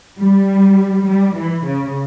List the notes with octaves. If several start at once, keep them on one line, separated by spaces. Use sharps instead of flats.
G3
G3
E3
C#3